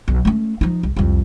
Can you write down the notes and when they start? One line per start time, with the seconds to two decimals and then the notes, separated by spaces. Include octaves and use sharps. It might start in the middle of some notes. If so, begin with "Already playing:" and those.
0.08 B1
0.25 A3 C#4
0.61 F3 D#4
0.83 C2
0.96 C2 F2